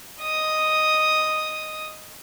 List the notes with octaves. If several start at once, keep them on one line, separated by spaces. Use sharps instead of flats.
D#5 D#6